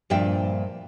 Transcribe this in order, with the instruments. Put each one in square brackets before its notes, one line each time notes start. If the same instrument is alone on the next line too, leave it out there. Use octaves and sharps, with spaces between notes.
[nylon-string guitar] G2 A#2 F3 D5 E5 G5